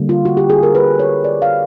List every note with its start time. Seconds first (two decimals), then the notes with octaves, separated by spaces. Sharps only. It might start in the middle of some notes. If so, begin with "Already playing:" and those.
Already playing: D3 G3 A#3
0.09 F4
0.25 F#4
0.37 G4
0.50 G#4
0.63 A#4
0.75 B4
1.00 C#5
1.24 D5
1.42 F5